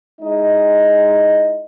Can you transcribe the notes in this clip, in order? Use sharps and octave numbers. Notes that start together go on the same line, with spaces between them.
G#3 D#4 E4 D#5